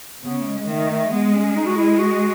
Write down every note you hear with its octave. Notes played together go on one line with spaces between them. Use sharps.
C#3 B3
A3
G#3
G#3
D#3 A3
A3
G#3 B3
C#4
D#4
F#4
E4
F#4